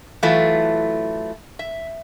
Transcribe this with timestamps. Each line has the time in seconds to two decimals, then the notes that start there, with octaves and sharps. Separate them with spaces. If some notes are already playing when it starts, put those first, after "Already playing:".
0.23 E3 F#3 A3 E4 F4
1.59 E5